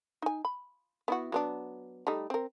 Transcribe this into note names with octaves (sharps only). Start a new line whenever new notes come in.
D#4 G#5
B5
B3 E4 F#4
F#3 B3 D4
G3 A3 D#4
C4 A#4